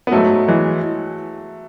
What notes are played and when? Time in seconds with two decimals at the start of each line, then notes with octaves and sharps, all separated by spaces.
0.07 B3
0.11 G#2 F#3 A3
0.48 E3 G#3